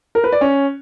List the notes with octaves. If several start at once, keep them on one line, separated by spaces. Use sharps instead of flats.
A#4
B4
D5
C#4